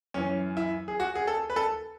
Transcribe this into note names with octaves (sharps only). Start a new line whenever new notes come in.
F#2 E3 C#4
E4
G#4
F#4
G#4
A4
B4
A4